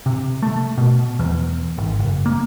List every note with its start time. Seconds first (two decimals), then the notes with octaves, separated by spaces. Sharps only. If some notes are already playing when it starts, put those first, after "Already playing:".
0.06 C3
0.42 A3
0.78 B2
1.19 E2
1.78 G#1
1.99 F#1
2.26 A#3